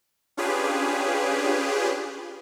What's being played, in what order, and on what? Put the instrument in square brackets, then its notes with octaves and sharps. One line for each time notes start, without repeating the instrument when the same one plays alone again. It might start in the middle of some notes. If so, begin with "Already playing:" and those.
[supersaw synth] C#4 D4 F4 G4 G#4 B4